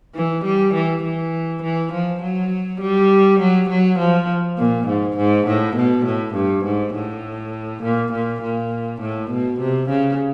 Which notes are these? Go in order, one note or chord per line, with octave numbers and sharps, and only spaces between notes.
E3
G3
E3
E3
E3
F3
F#3
G3
F#3
F#3
F3
A#2
G#2
G#2
A2
B2
A2
G2
G#2
A2
A#2
A#2
A#2
A2
B2
C3
C#3